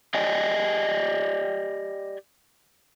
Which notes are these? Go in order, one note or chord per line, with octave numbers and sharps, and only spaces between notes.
G4 D5 D#5 G5 G#5